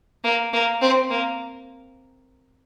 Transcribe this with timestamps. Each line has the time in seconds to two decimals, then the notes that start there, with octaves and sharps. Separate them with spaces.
0.24 A#3
0.53 A#3
0.82 C4
1.11 A#3